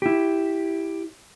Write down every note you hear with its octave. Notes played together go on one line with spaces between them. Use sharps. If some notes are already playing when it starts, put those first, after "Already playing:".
E4 G4